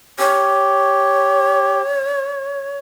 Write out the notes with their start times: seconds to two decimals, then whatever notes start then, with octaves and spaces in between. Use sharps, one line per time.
0.19 G4 C#5